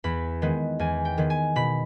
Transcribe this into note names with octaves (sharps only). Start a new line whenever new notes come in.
E2 B5
D#3 G#3 B3
E2 G#5
G5
D#3 G#3 B3
G#5
B2 B5